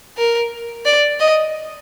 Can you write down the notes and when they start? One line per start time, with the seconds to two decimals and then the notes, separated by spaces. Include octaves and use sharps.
0.17 A#4
0.85 D5
1.20 D#5